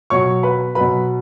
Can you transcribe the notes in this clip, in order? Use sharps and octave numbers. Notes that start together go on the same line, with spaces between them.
B2 F#3 C#5 C#6
B4 B5
B2 F#3 B4 B5